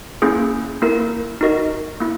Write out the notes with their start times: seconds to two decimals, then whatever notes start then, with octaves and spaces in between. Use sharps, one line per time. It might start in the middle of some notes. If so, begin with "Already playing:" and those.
0.22 A#3 C#4 E4 G#4
0.82 A#3 E4 A#4
1.41 D#4 F#4 A#4 D#5
2.00 A#3 E4